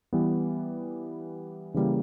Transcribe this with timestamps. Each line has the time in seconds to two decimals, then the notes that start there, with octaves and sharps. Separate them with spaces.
0.13 E3 G3 B3
1.74 C#3 E3 G3 A#3